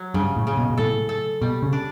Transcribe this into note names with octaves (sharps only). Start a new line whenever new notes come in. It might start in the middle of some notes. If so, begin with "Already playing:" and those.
Already playing: F#3
G2 C#3
A2
C#3
B2
B2
A2 A4
A4
B2 G3
C#3
D4